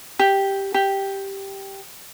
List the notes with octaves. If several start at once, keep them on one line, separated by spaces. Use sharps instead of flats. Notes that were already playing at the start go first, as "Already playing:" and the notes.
G4
G4